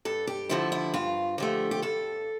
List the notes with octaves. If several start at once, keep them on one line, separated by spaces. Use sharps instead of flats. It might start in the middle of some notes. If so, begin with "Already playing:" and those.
G2 A4
G4
D3 F3 A3 E4
E4
G2 F4
D3 F3 A3 G4
G4
G2 A4